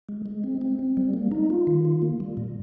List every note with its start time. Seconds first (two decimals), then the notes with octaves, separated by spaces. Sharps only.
0.09 G#3
0.26 G#3
0.44 C4
0.61 C4
0.79 C4
0.97 G3
1.14 A#3
1.32 D#4
1.50 F4
1.67 D#3
1.85 F4
2.02 A#3
2.20 G3
2.37 A#2